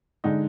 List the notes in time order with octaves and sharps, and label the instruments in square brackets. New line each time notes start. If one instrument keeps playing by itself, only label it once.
[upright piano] D3 G#3 D#4